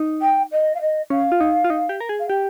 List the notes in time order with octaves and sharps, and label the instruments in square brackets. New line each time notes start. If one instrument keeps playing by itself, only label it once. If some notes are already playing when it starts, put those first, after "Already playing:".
Already playing: [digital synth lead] D#4
[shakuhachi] G5
D#5
F5
D#5
[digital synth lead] C#4 [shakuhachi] F5
[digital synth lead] F4
D#4
F4
D#4
G4
A#4
G#4
[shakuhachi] F5
[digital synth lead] G4 [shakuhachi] G5